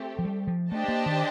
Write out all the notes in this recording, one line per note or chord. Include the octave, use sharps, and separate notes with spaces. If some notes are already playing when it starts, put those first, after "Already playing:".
Already playing: A3 C4 G4
F3
G3
F3
A3 D4 G4 C5 D#5 A5
A#3
D#3